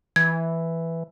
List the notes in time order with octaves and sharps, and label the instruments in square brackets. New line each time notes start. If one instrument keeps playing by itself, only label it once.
[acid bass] E3 [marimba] G#6